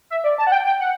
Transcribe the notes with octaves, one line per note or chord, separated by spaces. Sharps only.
E5
D5
A5
F#5
G5
G5
F#5